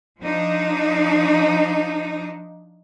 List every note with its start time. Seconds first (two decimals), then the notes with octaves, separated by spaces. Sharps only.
0.21 F3 D4 D#4